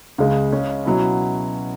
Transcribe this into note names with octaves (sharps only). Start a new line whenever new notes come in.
C#2 C#3 G#3
C#3 G#3 C#4
B2 F#3 C#4 E4